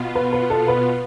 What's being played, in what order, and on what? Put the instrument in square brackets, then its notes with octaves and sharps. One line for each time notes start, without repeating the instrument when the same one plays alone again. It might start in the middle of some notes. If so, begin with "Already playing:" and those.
Already playing: [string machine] B2 B3 F4
[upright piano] B4
B4
A4
B4